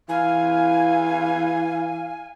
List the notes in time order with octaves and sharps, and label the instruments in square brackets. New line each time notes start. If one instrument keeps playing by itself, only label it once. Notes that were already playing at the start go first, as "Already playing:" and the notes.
[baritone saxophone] E3 [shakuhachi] F5 [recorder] G#5